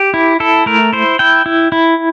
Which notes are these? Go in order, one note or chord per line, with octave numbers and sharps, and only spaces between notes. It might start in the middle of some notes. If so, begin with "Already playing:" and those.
Already playing: G4
E4
E4 A4
A3 A#4
E4 C5
E4 G5
E4
E4